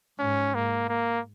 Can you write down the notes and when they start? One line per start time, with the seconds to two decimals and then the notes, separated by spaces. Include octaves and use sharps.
0.19 G#2 C#4
0.54 A#3
0.89 A#3